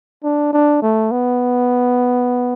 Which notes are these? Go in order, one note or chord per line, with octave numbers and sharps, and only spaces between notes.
D4
D4
A3
B3